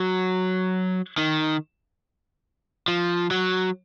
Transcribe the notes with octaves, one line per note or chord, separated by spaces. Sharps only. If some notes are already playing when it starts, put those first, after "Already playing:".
Already playing: F#3
D#3
F3
F#3